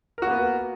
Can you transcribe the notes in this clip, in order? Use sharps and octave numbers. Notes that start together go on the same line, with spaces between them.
A#3 B3 F#4 A#4